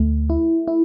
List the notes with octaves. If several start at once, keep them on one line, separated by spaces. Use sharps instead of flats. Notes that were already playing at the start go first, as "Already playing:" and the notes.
Already playing: D2 A3
E4
E4